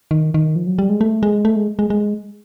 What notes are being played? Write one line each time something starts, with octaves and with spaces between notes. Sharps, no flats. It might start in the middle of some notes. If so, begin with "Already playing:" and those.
D#3
D#3
F3
F#3
G3
G#3
A3
G#3
A3
G#3
G#3
G#3